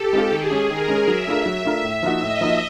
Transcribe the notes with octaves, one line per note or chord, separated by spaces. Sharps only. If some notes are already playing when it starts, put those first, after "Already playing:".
Already playing: G4 A4
G#3 C4 F4
D#3 G#4
G#3 C#4
D#3 A#4
G#3 C#4
F#3 E5
A3 D4 F4 A#4
F#3
A3 D4 F4 A#4
A2
F3 A#3 D#4 F#4
A2 D#5
F3 A#3 D#4 F#4